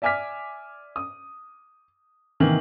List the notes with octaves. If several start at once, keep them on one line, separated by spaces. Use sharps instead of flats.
D5 E5 G#5 D6 F6 B6
D#6
C3 D#3 E3 A#3